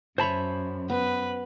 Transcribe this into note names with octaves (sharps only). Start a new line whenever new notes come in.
F#2 C5 C#5 E5 G#5 A5 B5
B3 B4